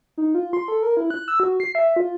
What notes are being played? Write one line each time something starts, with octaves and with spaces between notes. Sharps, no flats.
D#4
F4
C6
A4
A#4
E4
F#6
E6
F#4
C7
E5
F4